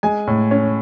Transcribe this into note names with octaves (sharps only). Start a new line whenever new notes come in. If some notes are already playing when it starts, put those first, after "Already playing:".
G#3 G#5
A2
C#4